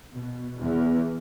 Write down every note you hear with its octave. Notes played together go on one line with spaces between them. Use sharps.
B2
E2